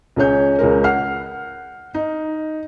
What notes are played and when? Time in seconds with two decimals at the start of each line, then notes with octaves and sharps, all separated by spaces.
0.16 C#2 C#4 G#4 C#5 G6
0.59 C#2 G#3 A#4
0.84 F#5 F6 C7
1.94 D#4